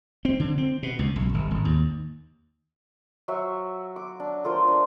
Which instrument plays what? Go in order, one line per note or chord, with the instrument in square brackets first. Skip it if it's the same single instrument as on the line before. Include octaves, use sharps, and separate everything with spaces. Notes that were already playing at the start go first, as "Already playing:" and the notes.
[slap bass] C4
D3
C4
B2
C#2
B1
G1
G#1
D#2
[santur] F#3 F#4 E5 F5
D6
D4
A3 F4 A#4 C5
D4